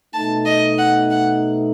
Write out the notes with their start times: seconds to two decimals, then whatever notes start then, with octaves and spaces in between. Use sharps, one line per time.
0.14 B2 A3 D#4 A5
0.46 D#5
0.78 F#5
1.11 F#5